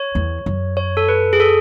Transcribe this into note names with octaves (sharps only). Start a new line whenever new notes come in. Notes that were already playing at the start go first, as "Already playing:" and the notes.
Already playing: C#5
E2
F#2
C#5
A4
B4
G#4
A4